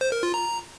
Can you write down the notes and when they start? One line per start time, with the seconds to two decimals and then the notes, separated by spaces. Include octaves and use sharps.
0.01 C5
0.12 A#4
0.23 F4
0.34 A#5